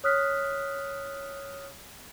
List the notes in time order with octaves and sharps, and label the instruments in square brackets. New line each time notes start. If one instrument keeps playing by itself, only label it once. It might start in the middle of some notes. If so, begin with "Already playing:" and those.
[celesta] C#5 D#6 F6 F#6 B6